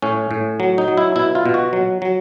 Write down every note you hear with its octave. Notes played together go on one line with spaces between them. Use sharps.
A2 C#4
A2
F#3
D#4
F#3
E4
B2 E4
F4
B2
F#4
F#3
F#3